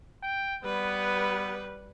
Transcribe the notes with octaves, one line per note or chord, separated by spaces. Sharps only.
G5
G3 B3 B4